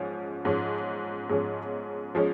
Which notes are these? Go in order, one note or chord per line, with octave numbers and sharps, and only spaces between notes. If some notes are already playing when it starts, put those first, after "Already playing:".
Already playing: G#2 F3 G#3 C#4
G#2 F3 G#3 C#4
G#2 F3 G#3 C#4
F3 G#3 C#4